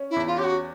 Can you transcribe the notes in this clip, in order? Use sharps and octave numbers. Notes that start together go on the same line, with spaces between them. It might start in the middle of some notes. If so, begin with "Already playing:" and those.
Already playing: C#4
E4
E2
F4
C#4 G4
F#4